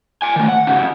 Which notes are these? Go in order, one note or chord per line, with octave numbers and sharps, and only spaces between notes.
D5 G#5
D#3 A3
F#5
G#2 C#3
F2